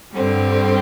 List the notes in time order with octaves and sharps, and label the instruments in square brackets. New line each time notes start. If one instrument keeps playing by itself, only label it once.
[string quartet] G2 D3 G3 C4